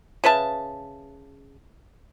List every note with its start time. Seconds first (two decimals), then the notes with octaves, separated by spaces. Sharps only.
0.24 C#3 B4 E5 A5